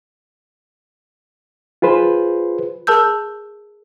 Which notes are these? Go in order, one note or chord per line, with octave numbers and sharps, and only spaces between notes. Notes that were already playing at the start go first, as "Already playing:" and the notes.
F4 G#4 B4 C5
G#4 A#4 A5 E6 G6